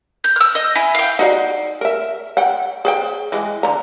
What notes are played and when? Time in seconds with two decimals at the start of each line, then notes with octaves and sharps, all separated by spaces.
0.24 G6
0.36 E6 F6
0.55 D#5
0.75 E4 G#5
0.95 F5 G5
1.19 D#4 F#4 D5
1.81 A#4 E5
2.37 F#5 G5
2.85 G#4 C5 G5
3.32 E3 G#3
3.63 D3 A#5